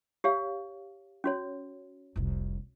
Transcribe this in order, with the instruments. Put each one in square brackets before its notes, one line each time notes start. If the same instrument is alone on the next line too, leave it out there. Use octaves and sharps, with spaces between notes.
[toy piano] G4 C#5 F5
C#4 F#4 C#5
[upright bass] F1 C2